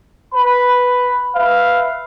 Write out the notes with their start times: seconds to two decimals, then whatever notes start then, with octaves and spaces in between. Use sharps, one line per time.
0.34 B4 B5
1.35 B4 E5 F5